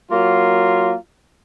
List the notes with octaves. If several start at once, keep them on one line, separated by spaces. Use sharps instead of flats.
F#3 A#3 F4